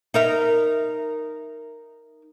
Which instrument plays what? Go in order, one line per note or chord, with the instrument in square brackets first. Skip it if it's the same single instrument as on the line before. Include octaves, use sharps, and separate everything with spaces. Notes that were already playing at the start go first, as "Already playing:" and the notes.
[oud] D#4 A#4 E5